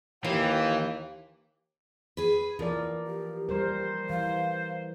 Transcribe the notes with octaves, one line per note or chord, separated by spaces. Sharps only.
D#2 E3 F4 G4
G#4 B4
E3 F3 A#4 D5
G4
G3 A#4 C5
E3 F5